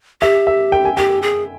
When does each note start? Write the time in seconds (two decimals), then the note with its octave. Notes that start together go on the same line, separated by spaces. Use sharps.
0.21 G4 E5
0.47 E5
0.72 G5
0.85 G#5
0.97 G4 G5
1.22 G#4